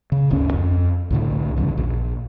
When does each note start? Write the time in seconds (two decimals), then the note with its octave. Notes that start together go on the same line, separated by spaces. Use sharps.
0.12 C#3
0.30 D1 G1 D2 C#4
0.53 F2
1.10 C2 A2 D3
1.57 B1 E2 G2 C#3
1.77 A#1